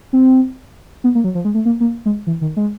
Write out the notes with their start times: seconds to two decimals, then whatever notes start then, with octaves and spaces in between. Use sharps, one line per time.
0.13 C4
1.04 B3
1.15 A#3
1.24 F#3
1.35 F3
1.45 G#3
1.54 A3
1.65 A#3
1.80 A#3
2.06 G#3
2.27 E3
2.41 D#3
2.57 G#3